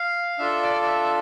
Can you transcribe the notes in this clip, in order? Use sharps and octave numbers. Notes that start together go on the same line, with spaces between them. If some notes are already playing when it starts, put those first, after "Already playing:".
Already playing: F5
D4 F4 A4 E5
D5
D5
E5